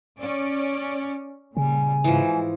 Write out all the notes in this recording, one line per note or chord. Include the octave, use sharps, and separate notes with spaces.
C#4 D5
A#2 C#3 G3 G#5
G#2 E3 F3